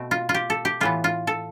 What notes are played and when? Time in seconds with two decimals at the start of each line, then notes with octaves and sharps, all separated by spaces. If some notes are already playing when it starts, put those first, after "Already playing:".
Already playing: B2 A3 C4
0.11 F4
0.29 F4
0.34 G4
0.50 A4
0.65 G4
0.80 A2 E3 B3 F4
1.04 F4
1.27 A4